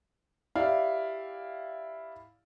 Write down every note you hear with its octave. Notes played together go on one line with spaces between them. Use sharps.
E4 G4 D5 F5